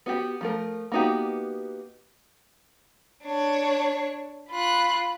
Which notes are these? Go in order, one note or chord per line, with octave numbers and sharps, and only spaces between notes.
B3 F#4 G4
F3 A3 A#4
A#3 B3 D#4 F#4 G4
D4 C#5
F4 B5 F#6